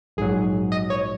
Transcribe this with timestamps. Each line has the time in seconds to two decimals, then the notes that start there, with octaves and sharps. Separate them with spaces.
0.17 A#1 G#2 F#3 G#4
0.72 D#5
0.90 C#5